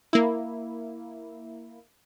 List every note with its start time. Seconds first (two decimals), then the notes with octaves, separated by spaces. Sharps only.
0.13 A#3 E4